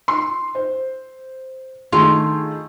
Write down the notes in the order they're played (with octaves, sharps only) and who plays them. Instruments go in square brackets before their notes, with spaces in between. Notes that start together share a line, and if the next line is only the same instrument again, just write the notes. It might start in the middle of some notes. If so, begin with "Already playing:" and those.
[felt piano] C6
C5
[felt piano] D#3 A3 G#4 [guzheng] F4